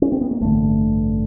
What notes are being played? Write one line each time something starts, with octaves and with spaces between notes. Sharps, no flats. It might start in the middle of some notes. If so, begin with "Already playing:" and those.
C#4
C4
B3
A#3
A1 G2 D3 A3